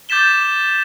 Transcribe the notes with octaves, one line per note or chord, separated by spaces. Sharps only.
D6 G6 A6 B6 E7 G7